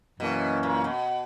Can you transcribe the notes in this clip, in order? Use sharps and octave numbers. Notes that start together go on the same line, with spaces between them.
F#2 B2 E3 A#3 C#4
A#2
B2